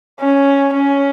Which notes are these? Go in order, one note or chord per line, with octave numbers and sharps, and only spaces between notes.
C#4
C#4